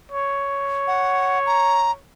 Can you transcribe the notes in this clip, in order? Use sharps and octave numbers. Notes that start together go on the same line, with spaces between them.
C#5
F#5
A#5